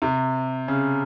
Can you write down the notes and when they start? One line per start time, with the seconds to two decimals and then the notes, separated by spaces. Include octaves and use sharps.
0.02 C3
0.68 C#3